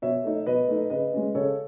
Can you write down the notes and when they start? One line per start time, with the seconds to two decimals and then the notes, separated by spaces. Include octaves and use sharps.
0.02 B2 C#5 E5
0.24 A3 D#4
0.46 B2 B4 D#5
0.68 A3 D#4
0.90 C#3 B4 D#5
1.13 G#3 C#4
1.35 C#3 A4 C#5